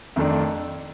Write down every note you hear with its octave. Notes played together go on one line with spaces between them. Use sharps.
F2 D#3 A3 D4